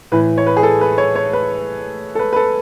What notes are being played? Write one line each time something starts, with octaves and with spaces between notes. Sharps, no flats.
A2 E3 B4
C#5
B4
G#4
A4
B4
C#5
C#5
B4
A4
B4
B4
A4